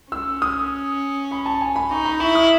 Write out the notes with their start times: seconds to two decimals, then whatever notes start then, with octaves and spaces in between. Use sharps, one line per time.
0.12 C#4 E6
0.42 D#6
1.31 B5
1.46 A5
1.61 G#5
1.76 B5
1.91 D#4 C#6
2.05 B5
2.20 E4 C#6
2.35 D#6